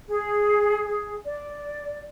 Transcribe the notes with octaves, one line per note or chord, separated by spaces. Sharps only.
G#4
G#4
D5